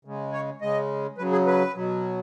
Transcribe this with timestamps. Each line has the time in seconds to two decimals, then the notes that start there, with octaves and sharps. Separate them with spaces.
0.05 C#3 G#3
0.32 C#5
0.61 C#3 G#3 D#5
1.18 C#3 F#3 B4
1.32 G#4
1.46 B4
1.74 B2 F#3